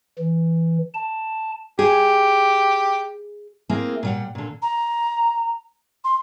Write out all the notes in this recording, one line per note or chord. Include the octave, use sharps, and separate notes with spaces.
E3
A5
G4 G#4
G#3 A#3 C4 E4 G#4
A#2 G3 F#5
A#2 D3
A#5
C6